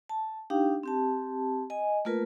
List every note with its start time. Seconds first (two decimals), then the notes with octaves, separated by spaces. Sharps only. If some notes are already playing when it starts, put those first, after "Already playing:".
0.09 A5
0.50 D4 D#4 G4 F5 G5
0.83 C4 G4 A5
1.70 D#5 G#5
2.05 A3 A#3 F4 A#4 B4